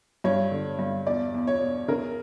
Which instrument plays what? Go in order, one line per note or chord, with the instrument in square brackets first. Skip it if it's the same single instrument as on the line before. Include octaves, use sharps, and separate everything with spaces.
[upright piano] G2 C#5
D3
G2
E2 D5
E2
C#5
B2
C#3 A#4